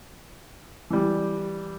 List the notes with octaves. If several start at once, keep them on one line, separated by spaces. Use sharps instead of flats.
E3 G3